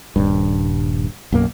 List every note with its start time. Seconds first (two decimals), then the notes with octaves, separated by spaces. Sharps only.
0.16 D#1 G2
1.32 B1 F#2 A#3